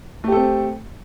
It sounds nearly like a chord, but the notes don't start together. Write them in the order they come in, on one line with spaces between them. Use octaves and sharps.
A3 G4 A4 C4